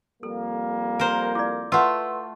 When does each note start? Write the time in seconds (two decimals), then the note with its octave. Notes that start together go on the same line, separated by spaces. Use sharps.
0.23 F2 G3 A#3 A4
0.99 A#4 C5
1.35 E4 D5 D6
1.72 A3 F4 B4 F5 F#5 C6 E6